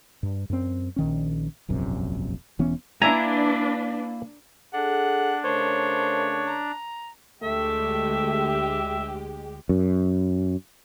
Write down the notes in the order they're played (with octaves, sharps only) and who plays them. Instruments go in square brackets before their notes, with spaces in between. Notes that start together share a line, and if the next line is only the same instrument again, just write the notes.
[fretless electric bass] G2
F#2 C4
A#1 D#3 C#4
E1 A#1 F#2 C3
E1 E3 B3 C#4
[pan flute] A#3 [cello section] D4 B4 [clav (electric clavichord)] E4 E5 G#5 [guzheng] A#5
[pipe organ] D4 [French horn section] G#4 A4 [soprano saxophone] F#5
[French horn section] C#3 A3 A#4 [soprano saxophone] C5 [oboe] C#5
[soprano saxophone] A#5
[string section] D2 G#3 G4 [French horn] A3 [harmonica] E5
[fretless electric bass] F#2